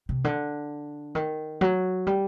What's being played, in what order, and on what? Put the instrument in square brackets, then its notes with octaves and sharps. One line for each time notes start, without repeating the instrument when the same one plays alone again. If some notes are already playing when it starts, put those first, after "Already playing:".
[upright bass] C3
D3
D#3
F#3
G3